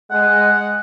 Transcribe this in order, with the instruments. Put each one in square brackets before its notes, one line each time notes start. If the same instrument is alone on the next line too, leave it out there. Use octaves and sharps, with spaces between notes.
[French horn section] G#3 [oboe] F#5